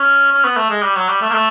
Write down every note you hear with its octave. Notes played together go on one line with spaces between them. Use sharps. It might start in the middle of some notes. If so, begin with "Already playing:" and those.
Already playing: C#4
C#4
B3
A3
G#3
G3
F#3
G3
A3
A#3
A3